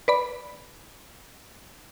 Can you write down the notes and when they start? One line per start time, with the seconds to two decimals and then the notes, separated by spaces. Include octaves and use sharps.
0.08 B4 D5 B5